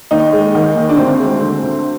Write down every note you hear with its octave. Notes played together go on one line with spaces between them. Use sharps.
D#2 D#4
G#3
D#3
D#2
D4
D2 C4
G#3
D3
D2